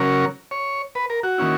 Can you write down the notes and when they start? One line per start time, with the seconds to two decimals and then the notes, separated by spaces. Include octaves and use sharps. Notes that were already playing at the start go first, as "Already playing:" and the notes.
Already playing: C#3 F#3 C#4 A#4
0.51 C#5
0.95 B4
1.10 A#4
1.23 F#4
1.38 D#3 A#3 C#4 E4